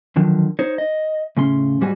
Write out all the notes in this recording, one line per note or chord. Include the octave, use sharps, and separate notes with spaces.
D3 D#3 F3 F#3
D#4 C5 C#5
D#5
A2 C#3 C#4 C6
G#2 G3 G#3 F#4 G#5